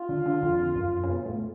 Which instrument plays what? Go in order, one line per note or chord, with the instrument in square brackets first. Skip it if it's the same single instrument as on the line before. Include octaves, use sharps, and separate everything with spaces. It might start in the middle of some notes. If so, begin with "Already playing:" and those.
Already playing: [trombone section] F4
[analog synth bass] D3
D3
F2
F#2
C#3
B2
A2